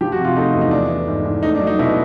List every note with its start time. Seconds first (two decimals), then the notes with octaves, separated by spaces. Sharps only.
0.01 F3 G4
0.12 F#4
0.18 C3
0.25 F4
0.36 A3 D#4
0.54 E2
0.61 D#4
0.71 A3 D4
0.90 E3
1.08 G#2
1.25 G#2
1.43 A3 D#4
1.55 D4
1.60 F#3
1.67 D#4
1.79 B2 E4